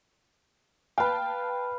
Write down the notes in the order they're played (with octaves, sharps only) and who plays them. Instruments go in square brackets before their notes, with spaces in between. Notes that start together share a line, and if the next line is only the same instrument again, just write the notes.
[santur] B4 F5 [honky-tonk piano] G5 A5